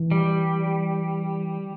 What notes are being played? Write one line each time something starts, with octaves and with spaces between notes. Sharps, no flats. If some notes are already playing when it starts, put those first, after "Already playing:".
Already playing: E3
G3